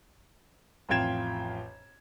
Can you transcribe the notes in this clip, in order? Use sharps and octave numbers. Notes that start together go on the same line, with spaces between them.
A1 F2 F4 G5 G#6 E7